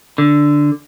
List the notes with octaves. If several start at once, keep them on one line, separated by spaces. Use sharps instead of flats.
D3